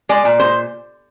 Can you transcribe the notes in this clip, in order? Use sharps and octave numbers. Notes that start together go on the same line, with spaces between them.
G#3 D5
A#2
G#3 C5